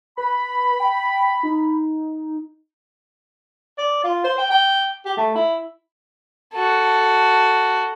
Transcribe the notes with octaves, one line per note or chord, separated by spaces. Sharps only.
B4 B5
G5
D#4
D5
F4
C5
G5
G5
G4
A3
E4
F#4 A4